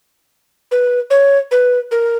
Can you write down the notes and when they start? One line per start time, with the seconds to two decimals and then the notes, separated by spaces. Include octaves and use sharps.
0.71 B4
1.10 C#5
1.51 B4
1.91 A#4